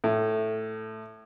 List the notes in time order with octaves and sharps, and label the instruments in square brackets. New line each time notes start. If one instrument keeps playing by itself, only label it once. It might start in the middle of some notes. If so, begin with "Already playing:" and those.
[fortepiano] A2